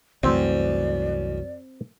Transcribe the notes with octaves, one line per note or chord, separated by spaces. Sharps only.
C2 F#2 E3 A3 C4 D5